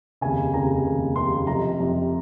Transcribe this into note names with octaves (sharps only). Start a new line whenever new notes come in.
F1 D#2 C#3 G#5
F1 D#2 C#3 A#5
F1 D#2 C#3
F1 D#2 C#3 C6
F1 F2 C3 A#5
F1 F2 C3